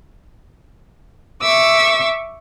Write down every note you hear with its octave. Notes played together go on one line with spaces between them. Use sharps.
E5 C#6 D6 E6